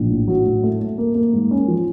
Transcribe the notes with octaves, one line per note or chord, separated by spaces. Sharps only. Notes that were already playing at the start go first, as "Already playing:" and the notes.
Already playing: A#1
A2
F#3
A2
A3
A3
A#3
A#3
G#2
C#4
F3